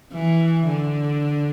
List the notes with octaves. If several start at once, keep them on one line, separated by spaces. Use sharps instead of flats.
E3
D3